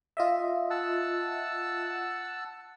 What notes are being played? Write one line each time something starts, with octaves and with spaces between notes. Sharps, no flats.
F4 D#5 E5
F#5 A5 E6